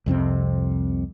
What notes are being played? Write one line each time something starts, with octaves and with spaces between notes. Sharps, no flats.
C2 F2 C3 C4